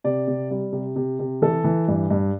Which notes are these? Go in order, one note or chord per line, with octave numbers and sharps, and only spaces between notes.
C3 D5
C3
G3
C3
C3
C3
E3 A4
E3
G2
G2